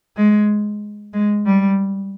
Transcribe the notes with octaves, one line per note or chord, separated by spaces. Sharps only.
G#3
G#3
G3